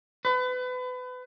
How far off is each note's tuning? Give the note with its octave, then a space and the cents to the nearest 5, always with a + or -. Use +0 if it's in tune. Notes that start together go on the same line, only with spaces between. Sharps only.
B4 +30